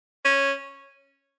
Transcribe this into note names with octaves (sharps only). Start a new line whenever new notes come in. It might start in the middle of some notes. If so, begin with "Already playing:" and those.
C#4